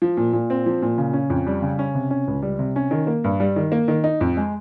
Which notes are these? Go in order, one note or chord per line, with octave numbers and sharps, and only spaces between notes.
F3
A#2
A#2
C4
F3
A#2
C#3
C#4
F2
G3
C#3
C#4
C3
C#4
C#2
G3
C3
C#4
D#3
A#3
G2
G3
D#3
A#3
D#3
D#4
F2
G#3